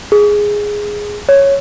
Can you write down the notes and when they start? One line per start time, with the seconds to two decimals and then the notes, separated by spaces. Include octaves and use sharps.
0.12 G#4
1.29 C#5